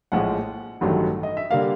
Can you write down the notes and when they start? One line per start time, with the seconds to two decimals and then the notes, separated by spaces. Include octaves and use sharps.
0.12 A#1 A2 F3 G#3 F#5
0.81 A1 G2 D#3 F#3 A3
1.23 D#5
1.37 E5
1.51 D3 G3 A#3 F5